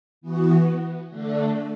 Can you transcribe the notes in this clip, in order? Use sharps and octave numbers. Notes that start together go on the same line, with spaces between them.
E3 B3 F#4
D3 A3 D4